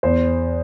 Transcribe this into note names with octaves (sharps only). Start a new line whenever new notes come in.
E2 C5